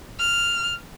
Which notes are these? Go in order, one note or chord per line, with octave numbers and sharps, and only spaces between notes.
F6